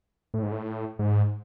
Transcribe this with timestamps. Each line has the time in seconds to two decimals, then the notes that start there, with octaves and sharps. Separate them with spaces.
0.34 A2
0.43 G#2
0.52 A2
0.99 G#2